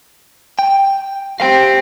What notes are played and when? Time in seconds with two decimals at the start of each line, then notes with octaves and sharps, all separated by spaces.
0.59 G5
1.40 C4 G4 F5 G5